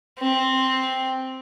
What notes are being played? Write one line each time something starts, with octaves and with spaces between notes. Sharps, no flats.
C4